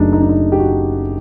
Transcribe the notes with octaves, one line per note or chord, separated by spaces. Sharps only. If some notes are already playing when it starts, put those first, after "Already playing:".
Already playing: F#1 F#2 F#3 A3 D4 D#4
D#4
D4
D#4
G4
F#4